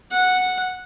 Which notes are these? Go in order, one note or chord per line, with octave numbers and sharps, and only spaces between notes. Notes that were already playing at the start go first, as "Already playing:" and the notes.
F#5